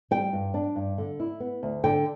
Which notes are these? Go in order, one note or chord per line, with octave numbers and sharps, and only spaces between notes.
G3 G5
G2
D4
G2
D3
E4
B3
D2
D3 G5